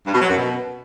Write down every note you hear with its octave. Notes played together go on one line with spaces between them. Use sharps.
G2
B2
F#3
F#2
B2